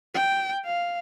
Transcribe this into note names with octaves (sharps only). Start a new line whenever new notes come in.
G5
F5